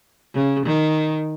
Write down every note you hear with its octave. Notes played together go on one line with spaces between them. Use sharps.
C#3
D#3